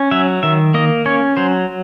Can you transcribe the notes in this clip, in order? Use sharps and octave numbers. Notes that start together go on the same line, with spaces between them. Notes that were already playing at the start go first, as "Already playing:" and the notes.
Already playing: C#4
F#3 E5
D#3 E5
A#3 D#5
C#4 C#5
F#3 C5